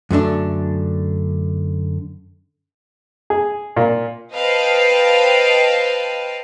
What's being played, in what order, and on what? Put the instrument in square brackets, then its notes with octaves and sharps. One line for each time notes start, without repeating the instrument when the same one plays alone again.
[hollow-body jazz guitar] F#2 D3 A3 D4
[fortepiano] G#4
A#2
[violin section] B4 C5 D#5 F5 G5 A5